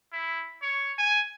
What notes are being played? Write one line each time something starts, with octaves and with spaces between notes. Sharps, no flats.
E4
C#5
G#5